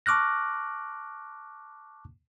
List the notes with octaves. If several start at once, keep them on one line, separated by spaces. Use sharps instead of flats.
A5 C#6 D6 F6 F#6 A#6